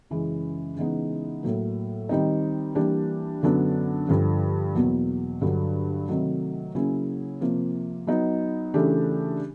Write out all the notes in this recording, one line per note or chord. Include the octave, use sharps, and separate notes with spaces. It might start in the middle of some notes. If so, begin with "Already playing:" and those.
F#2 C#3 E3 G#3
C#3 E3 G#3 B3 D#4
A2 F#3 A#3
D#3 G3 C4 D#4
E3 G3 A#3 D4 G4
F#2 D3 F#3 B3 D4
G2 D3 F3
E2 B2 F#3 A#3
G2 D3 F#3
C3 D#3 F#3 A3
C#3 F#3 A#3 C#4 E4
C3 F3 A#3
F#3 B3 D#4
C#3 E3 A3 D4 G4